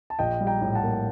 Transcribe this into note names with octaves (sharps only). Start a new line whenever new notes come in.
A5
A#1 D#5 G5
G3
G5 A#5
A2
F#5 A5
A#3